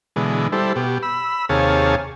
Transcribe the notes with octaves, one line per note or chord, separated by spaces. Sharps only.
B2 D3 E3 G#3
G3 E4 A4 C5
B2 G4
B5 E6
D#2 C3 G#4 C#5 F5 A5